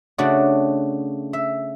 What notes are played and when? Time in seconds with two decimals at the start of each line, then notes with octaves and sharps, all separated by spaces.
0.18 C#3 A3 D4 F#4
1.33 E5